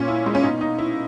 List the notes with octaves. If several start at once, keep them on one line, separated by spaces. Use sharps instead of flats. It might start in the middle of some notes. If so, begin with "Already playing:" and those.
Already playing: A#2 C#4
E4
G#3
C#4
B2 D#4
D#4
E4